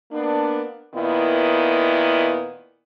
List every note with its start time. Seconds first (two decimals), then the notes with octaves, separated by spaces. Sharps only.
0.12 A#3 B3 D4
0.94 A#2 D#3 B3 E4